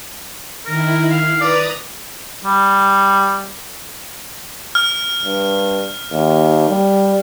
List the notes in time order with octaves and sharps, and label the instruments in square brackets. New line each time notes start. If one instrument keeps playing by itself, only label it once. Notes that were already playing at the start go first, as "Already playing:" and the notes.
[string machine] D#3 E4 [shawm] A#4
[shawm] F5
[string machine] B4 A#5 D#6 [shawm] D5
[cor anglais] G3
[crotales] F6
[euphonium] G2
D#2
G3